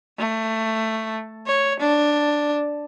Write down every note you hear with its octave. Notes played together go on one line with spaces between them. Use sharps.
A3
C#5
D4